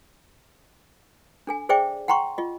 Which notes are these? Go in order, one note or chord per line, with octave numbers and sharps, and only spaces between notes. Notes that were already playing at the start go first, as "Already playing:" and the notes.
D4 A4 G#5
G#4 C5 D5 E5 G5 D6
F#5 G5 A#5 C6 C#6
F4 D#5